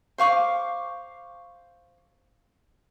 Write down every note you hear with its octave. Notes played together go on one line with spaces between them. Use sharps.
C5 F5 C#6 D6